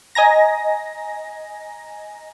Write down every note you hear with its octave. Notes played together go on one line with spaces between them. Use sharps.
D#5 G#5 A#5 A#6